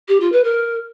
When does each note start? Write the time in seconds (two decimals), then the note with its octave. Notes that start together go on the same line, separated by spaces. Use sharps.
0.08 G4
0.20 F4
0.32 B4
0.44 A#4